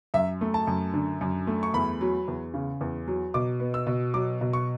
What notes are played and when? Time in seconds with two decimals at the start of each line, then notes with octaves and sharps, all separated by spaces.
0.14 F#2 E5
0.41 A3
0.54 A5
0.67 F#2
0.94 D3
1.21 F#2
1.47 A3
1.63 C#6
1.74 E2 B5
2.01 F#3
2.28 E2
2.54 C#3
2.81 E2
3.07 F#3
3.34 B2 D6
3.60 B3
3.74 E6
3.87 B2
4.14 F#3 D6
4.41 B2
4.53 C#6